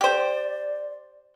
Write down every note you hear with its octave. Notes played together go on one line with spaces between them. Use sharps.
G4 C5 D5